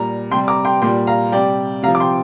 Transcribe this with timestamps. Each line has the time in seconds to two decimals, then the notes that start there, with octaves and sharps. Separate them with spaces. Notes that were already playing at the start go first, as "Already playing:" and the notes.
Already playing: A#2 G3 A#5
0.31 C3 G5 C6
0.35 G3
0.48 A#5 D6
0.65 G5 C6
0.82 A#2 G5 C6
0.85 G3
1.07 F5 A#5
1.32 C3 G3 D5 G5
1.83 C3 F5 A#5
1.88 F3
1.95 D6
2.00 G5 C6